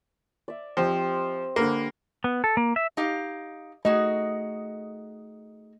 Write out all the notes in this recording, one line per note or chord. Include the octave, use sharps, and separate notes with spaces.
D5 E5
F3 C4 G4 D#5
D3 A#3 B4
B3
A4
A#3
E5
D#4 G4 F5
A3 D#4 F#4 G#4 D#5